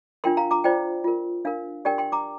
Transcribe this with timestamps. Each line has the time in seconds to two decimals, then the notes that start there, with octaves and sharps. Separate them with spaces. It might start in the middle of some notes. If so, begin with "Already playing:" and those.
0.24 D4 F4 A#4 G5 C6
0.37 F5 A#5
0.51 A#5 D6
0.64 F4 C5 D5 G5
1.04 F4 A#4
1.45 D4 A#4 F5
1.85 D4 G4 A#4 D5 G5
1.98 G5 C6
2.12 A#5 D6